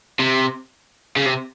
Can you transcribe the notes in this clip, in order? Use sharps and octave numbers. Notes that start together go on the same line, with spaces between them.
C3
C#3
C3